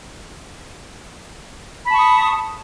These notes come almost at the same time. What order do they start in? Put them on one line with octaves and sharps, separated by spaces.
B5 A5 C#6 D#6